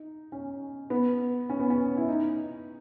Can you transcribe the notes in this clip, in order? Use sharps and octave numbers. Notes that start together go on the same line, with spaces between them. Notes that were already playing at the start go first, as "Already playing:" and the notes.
Already playing: D#4
C#4
B3
C#4
B3
C#4
E4
D#4